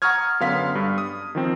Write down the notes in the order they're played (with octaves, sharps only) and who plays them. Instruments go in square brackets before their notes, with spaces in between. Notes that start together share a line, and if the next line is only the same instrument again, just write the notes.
[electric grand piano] F#5 A#5 C#6 D#6 F6 G#6
F#2 D3 B3 F5 C6 B6
G2
D#6
D#3 F3 C4